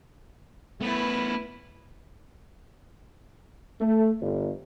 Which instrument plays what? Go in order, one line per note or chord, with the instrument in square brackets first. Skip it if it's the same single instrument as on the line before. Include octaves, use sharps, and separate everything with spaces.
[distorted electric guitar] A3 B3 [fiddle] E4 B4
[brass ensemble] A3
G1